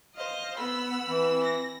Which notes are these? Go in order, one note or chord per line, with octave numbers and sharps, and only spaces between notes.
C5 D#5 F5
B3 F#5 B5 E6
E3 C4
A#6